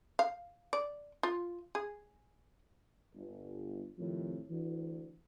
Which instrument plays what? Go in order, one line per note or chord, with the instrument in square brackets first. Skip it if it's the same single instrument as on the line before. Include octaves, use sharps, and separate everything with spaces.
[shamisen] F5
D5
F4
G#4
[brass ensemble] G1
F2 A2 C3 D#3 F3
D2 E3